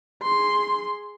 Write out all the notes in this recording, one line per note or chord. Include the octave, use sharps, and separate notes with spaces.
G#4 C6